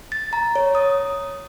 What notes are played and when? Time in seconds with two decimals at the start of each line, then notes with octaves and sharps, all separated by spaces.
0.12 A6
0.33 A#5
0.55 C#5
0.75 D#6